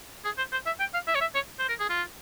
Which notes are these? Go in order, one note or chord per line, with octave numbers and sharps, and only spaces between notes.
G#4
C5
C5
E5
G5
F5
E5
C#5
E5
C#5
C5
A#4
G#4
F4